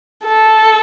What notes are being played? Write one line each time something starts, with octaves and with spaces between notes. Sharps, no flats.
A4